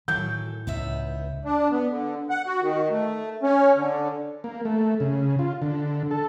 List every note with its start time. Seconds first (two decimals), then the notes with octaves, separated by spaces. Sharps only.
0.08 A2 D#3 E3 F#3 A4 G6
0.67 C#2 B3 D#4 E5
1.45 D4
1.71 B3
1.90 D3
2.30 F#5
2.47 F#4
2.62 D#3
2.90 A3
3.43 C#4
3.76 D3
4.44 A#3
4.65 A3
5.00 C#3
5.39 F4
5.62 D3
6.11 A4